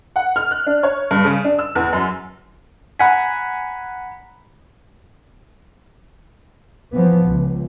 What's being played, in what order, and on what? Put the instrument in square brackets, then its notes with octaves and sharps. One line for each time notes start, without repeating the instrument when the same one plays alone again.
[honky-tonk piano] F#5
F6
F#6
D4
C#5
G2
C#3
D4
E6
E2
F#2
[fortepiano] F#5 G#5 [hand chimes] A#5 B5 B6
[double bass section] E3 F3 B3
C#2